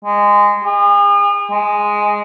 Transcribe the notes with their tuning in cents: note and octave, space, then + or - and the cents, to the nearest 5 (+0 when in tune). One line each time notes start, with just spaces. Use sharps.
G#3 -15
G#4 -40
G#3 +0